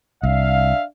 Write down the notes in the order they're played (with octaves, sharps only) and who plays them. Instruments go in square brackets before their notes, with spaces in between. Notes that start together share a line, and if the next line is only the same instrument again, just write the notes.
[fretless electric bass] C2 [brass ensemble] D4 E5 F5